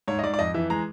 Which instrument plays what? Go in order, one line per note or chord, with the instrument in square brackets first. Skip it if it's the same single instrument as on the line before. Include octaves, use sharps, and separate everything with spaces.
[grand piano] G#2 C#5
D#5
G#2 D5
D5
F2 D#5
E3 E5
G#3 A#5